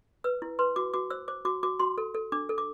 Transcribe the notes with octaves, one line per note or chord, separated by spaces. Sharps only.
B4 E6
E4
B4 C6
F#4 D6
F#4 D6
C5 E6
C5 D6
F#4 D6
F#4 D6
F#4 C6
A4
A4
D4 D6
A4
D6